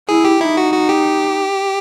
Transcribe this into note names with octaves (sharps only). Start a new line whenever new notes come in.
E4 G#4
G4
D#4 E4
F#4
F#4
G4